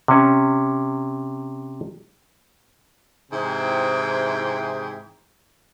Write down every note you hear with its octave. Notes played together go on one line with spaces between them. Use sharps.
C3 C#4
G#2 C3 E3 E4 G#4 G5